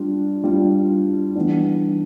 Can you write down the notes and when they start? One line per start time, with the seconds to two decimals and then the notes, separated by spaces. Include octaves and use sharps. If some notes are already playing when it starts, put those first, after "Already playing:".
Already playing: G3 D4 F4
0.44 G3 D4 F4
1.36 E3 G3 B3 D4